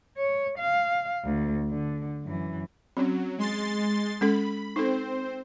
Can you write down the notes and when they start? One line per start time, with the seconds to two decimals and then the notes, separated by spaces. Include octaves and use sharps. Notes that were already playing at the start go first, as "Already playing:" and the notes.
0.17 C#5
0.58 F5
1.25 D2
1.70 D3
2.25 F#2 E3
2.97 F#3 C4 C#4
3.38 G#3 C6 A6
4.21 G#3 C#4 A4 B5
4.76 C4 D#4 A4 C5